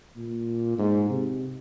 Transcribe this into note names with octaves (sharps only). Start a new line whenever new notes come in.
A#2
G#2
C3